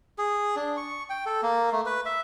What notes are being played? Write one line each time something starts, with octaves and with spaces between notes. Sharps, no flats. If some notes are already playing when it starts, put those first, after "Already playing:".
G#4
D4
C#6
G5
A4
A#3
A3
B4
E5